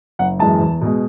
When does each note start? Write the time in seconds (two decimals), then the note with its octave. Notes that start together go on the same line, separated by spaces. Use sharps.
0.19 F#1 F#5
0.39 F#2 E3 G#3 A5
0.60 E2
0.81 B2 G#3